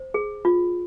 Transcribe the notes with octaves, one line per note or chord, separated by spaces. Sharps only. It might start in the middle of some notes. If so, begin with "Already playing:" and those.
Already playing: C5
G#4
F4